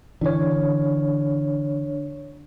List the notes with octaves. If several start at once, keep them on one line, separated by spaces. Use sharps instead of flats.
D3 E3 D4 C#5